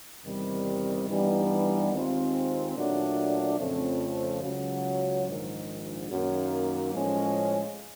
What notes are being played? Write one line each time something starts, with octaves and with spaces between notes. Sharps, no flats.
E2 C3 D#3 G3
G2 E3 G3 B3 D#4
D#2 D#3 G#3 C4 F4
A#2 F#3 A3 D4
F2 C#3 F3 A3 C4
C#2 C#3 F#3
A#1 G#2 D#3
F#2 D#3 F#3 A#3
A2 F3 G#3 C#4